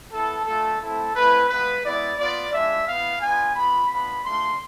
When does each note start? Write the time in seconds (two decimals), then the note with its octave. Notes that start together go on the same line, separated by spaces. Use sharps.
0.11 B3 E4 A4
0.46 A3 D4 F4 A4
0.80 A3 C4 E4 A4
1.14 A3 C4 E4 B4
1.49 G#3 B3 F4 B4
1.83 G#3 B3 E4 D5
2.18 B3 F4 D5
2.52 G#3 D4 F4 E5
2.86 B3 E4 F5
3.20 B3 D4 F4 G#5
3.55 B3 F4 B5
3.89 B3 D4 F4 B5
4.24 A3 D4 F4 C6